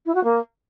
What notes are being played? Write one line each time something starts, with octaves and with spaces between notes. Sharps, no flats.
E4
F#4
A#3